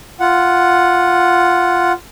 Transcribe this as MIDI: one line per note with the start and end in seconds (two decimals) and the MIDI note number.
0.20 1.92 65
0.20 1.92 78